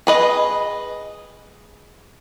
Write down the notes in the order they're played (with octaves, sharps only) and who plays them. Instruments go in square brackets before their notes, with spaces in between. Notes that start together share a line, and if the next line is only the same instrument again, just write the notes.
[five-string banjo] G#4 B4 D#5